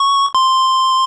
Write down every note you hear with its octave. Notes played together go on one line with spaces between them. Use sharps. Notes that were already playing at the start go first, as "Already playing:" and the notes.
Already playing: C#6
C6